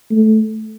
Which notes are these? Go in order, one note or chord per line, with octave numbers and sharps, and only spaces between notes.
A3